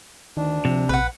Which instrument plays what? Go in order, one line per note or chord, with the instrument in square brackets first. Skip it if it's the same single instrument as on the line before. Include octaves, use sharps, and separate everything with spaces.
[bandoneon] D2 D4 [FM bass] D#3
[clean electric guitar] C3 [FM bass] F3
[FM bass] A#1 [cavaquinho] B4 F#5